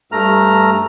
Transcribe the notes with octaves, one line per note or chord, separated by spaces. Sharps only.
G2 A3 A#5 F6